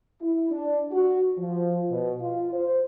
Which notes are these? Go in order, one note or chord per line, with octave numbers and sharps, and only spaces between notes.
E4
D4
F#4
F3
B2
F4
C5